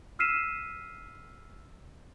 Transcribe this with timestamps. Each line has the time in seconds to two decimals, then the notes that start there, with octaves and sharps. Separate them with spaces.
0.19 E6 F6 B6 C7 D#7 E7